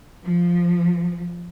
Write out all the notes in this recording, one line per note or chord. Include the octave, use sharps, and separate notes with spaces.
F3